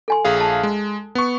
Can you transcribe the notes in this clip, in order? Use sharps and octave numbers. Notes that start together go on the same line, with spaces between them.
A4 G#5 C6
A#1 G#4 F5
A5
G#3
B3 C#6